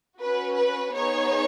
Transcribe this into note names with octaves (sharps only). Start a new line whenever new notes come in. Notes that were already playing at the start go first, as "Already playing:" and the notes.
C#4 F#4 B4
B4
B3 D#4 G#4 C#5